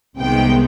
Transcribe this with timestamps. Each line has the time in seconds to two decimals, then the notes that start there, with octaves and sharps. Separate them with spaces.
0.18 C2 C3 D#3 G#3 B3 G5